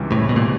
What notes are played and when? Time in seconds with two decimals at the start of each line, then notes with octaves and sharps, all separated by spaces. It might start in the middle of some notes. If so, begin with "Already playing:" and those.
Already playing: C#2 C3 E3 G3
0.12 A2
0.29 B2
0.36 A#2